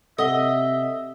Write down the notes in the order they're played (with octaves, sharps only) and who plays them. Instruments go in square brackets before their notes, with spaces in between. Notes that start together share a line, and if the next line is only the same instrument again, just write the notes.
[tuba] C3 [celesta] A4 F#5 G7 [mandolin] D#5 [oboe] E5